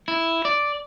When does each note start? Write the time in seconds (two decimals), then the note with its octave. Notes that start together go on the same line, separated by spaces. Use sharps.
0.08 E4
0.45 D5